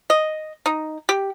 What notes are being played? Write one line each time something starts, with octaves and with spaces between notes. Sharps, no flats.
D#5
D#4
G4